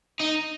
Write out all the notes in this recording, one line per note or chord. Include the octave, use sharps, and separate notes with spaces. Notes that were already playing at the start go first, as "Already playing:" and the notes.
D#4